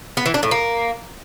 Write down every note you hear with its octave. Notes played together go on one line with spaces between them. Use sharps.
B3
E3
D4
A2
A#3